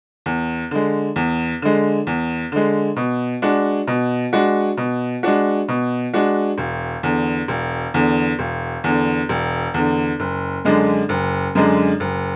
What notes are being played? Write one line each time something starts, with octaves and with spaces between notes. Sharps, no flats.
E2
D3 G#3
E2
D3 G#3
E2
D3 G#3
B2
G#3 D4 F#4
B2
G#3 D4 F#4
B2
G#3 D4 F#4
B2
G#3 D4 F#4
E1
E2 D3
E1
E2 D3
E1
E2 D3
E1
E2 D3
F#1
F#2 D3 G#3 D4
F#1
F#2 D3 G#3 D4
F#1